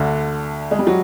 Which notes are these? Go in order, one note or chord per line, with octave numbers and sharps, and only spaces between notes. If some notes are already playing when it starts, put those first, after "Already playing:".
Already playing: D2 D3
G#3
G3
F#3